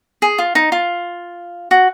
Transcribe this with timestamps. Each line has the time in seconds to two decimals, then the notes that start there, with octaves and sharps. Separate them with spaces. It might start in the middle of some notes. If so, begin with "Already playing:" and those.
0.22 G#4
0.38 F4
0.55 D#4
0.72 F4
1.71 F#4